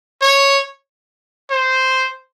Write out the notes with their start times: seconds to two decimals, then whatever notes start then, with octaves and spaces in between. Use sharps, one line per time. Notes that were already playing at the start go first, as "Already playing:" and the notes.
0.22 C#5
1.50 C5